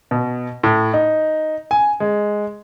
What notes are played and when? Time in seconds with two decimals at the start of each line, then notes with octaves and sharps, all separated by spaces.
0.11 B2
0.63 A2
0.94 D#4
1.71 G#5
2.00 G#3